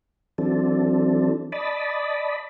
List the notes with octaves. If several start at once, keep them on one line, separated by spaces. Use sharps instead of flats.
E3 F#3 C4 D4 A4
D5 D#5 A5 B5